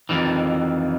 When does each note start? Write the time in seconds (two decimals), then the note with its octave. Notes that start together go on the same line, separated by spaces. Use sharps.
0.09 F2 D#3 E3